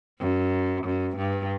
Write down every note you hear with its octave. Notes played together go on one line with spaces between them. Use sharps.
F#2
F#2
G2